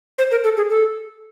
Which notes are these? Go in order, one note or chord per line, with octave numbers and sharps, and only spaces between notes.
C5
A#4
A4
G#4
A4